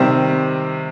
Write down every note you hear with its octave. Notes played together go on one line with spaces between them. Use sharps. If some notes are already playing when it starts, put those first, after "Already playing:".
Already playing: C3 D#3 G3 C4